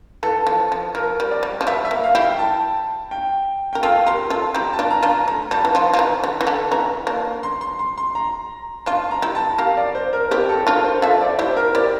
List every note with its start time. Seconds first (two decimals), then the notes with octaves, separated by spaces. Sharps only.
0.23 E3 A4
0.47 F3
0.72 F3
0.95 F3 A#4
1.20 G3
1.31 D5
1.43 G3
1.61 F3
1.67 G3 E5
1.85 E5
1.91 A#3
2.04 F5
2.15 E4 G4
2.21 G5
2.39 A5
3.11 G5
3.73 A#4 G5
3.83 F4 A4 F5
4.06 G4 A#4 C6
4.30 F4 A4 C6
4.54 E4 G4 A#5
4.73 A5
4.79 D4 F4
4.90 A#5
5.03 D4 F4
5.09 A#5
5.27 A3 A#5
5.51 G3 A5
5.65 E3
5.75 F3 C6
5.93 F3
5.98 E3 A#5
6.24 D3
6.41 E3
6.47 D3
6.71 E3 A#5
7.07 A#3 D4
7.43 C6
7.61 C6
7.79 C6
7.98 C6
8.15 A#5
8.86 D4 F4 C6
9.11 A#5
9.22 E4 G4
9.35 A5
9.58 G4 A#4 F5
9.77 D5
9.95 C5
10.13 A#4
10.31 C4 E4 G4
10.49 A4
10.67 D4 F4 A#4
10.84 C5
11.02 F4 A4 E5
11.21 D5
11.39 E4 G4 C5
11.57 A#4
11.75 E4 G4 D5